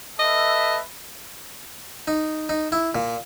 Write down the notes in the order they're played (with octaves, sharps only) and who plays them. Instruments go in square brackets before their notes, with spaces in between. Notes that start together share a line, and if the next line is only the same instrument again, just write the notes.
[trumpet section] A4 B4 E5 [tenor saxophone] D#5
[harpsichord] D#4
D#4
E4
A#2